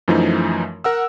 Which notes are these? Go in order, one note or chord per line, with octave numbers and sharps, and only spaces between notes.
F#2 E3 F3 A3 D#4
A#4 F#5 E6